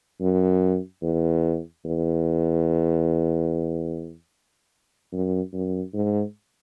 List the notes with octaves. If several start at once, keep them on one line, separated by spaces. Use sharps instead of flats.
F#2
E2
E2
F#2
F#2
G#2